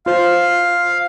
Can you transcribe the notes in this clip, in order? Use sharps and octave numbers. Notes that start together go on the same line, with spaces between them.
F4 C5 F5